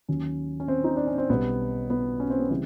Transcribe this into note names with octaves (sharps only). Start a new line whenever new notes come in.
D#2 D#3 F#3 C#4
C#4
C4
D#4
D4
C#4
C4
B1 B2 G3 B3
B3
C#4
C4
B3
C#3 E3 G3 C4